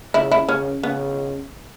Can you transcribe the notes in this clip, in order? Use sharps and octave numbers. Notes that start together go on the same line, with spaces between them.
C#3 E4
E4
C#3 C#4
C#3 B3